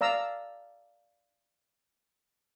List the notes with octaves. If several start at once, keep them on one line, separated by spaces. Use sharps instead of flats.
D5 F5 A#5 E6